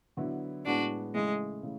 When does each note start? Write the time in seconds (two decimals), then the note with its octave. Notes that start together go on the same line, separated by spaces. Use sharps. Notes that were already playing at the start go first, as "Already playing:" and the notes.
0.17 D3 F#3 B3 E4
0.65 A2 G#3 B3 D4 F#4
1.14 C#3 E3 G#3 A3 E4
1.63 C#3 E3 A3